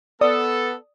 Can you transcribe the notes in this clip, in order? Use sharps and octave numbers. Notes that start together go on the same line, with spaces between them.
B3 A4 D5 D#6